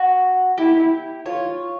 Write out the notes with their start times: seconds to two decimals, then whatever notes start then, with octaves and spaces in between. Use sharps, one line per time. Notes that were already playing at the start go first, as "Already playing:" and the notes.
Already playing: F#4
0.58 E4 G4
1.26 F4 C#5